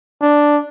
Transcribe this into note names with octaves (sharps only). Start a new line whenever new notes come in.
D4